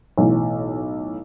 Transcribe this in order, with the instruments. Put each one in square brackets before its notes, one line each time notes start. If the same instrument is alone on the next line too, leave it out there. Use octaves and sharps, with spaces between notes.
[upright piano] B1 A2 E3